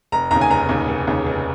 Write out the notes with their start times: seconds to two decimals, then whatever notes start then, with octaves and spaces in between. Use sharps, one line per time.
0.12 F1 A#5
0.31 D#2 C#3 A#5
0.41 G#5
0.50 F1 A#5
0.69 D#2 C#3
0.88 F1
1.07 D#2 C#3
1.26 F1